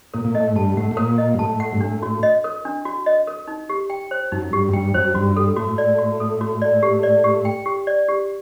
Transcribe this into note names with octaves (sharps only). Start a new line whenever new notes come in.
A#2 A#4
A#2
A2 D#5
G2 A5
A2 F#5
A2
A#2 A#4
D#5
G2
A2 A5
F#5
G2
A2 D4
F#4
D#5
A#4
D4
F#4
D#5
A#4
D#4
G4
G5
C5
F#2 D#4
G2 G4
F#2
G2 G5
F#2 C5
G2 F#4
A4
A2 F#4
D5
F#4
A4
F#4
D5
G4
D5
G4
G5
G4
D5
G4